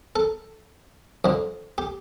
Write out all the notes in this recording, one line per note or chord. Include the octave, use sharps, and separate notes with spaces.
A4
F2 D3
G4